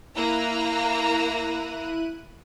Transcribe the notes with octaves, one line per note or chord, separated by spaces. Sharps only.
A#3 E4 A#5 F#6 D#7